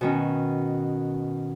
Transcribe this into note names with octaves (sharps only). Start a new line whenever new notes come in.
B2 D#3 C#4